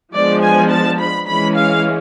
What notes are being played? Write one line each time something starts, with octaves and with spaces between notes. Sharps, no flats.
F3 G#3 B3 D4 D5
G#5
A5
B5
E3 G#3 C#4 B5
F5